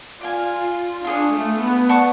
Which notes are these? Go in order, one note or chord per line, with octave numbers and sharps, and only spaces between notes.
F4 D5 F5 G#5
D4 F4 G#4 C#5
A3
B3
D5 F#5 A5 C#6